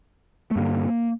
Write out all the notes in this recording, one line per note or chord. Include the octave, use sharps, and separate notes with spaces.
A3
G2 D3 A#3